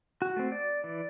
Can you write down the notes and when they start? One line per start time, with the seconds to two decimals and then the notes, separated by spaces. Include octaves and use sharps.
0.22 F#4
0.36 A3 C4
0.52 D5
0.84 E3